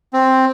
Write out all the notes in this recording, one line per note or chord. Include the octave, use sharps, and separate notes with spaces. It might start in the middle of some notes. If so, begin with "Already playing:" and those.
C4